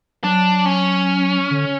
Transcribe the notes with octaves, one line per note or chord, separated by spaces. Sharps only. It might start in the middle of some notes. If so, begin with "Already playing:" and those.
F#3 D4
C#4
D3